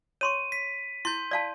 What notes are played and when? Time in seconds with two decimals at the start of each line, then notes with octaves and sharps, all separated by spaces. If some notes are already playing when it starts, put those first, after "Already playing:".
0.21 C#5 C6 C#6 D#7
0.52 B6
1.05 E4 C6 G6
1.31 D5 F5 A5